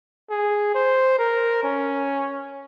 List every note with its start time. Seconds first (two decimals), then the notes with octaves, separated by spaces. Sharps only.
0.30 G#4
0.75 C5
1.18 A#4
1.63 C#4